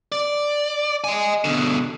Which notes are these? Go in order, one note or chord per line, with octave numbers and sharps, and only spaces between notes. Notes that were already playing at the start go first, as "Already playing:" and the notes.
D5
D#5 G#5
B2 D3